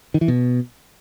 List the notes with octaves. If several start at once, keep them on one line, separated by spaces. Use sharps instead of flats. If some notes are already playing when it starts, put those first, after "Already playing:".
D#3
E3
B2